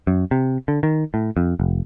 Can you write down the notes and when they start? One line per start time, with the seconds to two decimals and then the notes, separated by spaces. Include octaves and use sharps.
0.07 F#2
0.31 C3
0.68 D3
0.83 D#3
1.14 A2
1.37 F2
1.60 F1